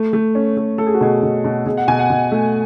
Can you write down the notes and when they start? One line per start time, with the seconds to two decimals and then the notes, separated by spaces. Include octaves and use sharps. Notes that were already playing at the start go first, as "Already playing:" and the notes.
Already playing: A3
0.13 A3
0.35 C#4
0.57 A3
0.78 A3 A4
0.87 G#4
0.94 F#4
1.01 B2 G#4
1.23 B2
1.44 B2
1.66 B2 G#4
1.77 F#5
1.88 B2 G#5
1.99 F#5
2.10 B2
2.32 A3